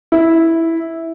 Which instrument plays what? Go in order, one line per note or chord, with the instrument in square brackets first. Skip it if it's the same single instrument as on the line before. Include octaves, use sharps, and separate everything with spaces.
[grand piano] E4